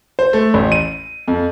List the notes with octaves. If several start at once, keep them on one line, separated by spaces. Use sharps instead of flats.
C5
A3
A1
D#7
F2